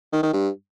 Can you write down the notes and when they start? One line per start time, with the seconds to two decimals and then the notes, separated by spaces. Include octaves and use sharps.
0.13 D#3
0.23 D#3
0.33 G2